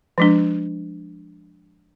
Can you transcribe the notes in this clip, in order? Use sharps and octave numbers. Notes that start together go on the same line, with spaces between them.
F3 G#3 D4